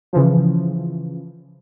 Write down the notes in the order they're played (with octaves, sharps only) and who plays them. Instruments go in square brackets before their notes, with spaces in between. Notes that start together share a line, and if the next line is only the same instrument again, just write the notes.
[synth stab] C#3 E3 F3